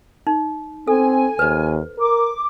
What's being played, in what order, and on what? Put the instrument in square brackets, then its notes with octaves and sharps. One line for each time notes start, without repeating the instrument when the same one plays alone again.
[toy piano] D#4
[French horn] C4 [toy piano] A4 [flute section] G#5
[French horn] D#2 [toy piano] B4 C5
[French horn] A#4 [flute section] D6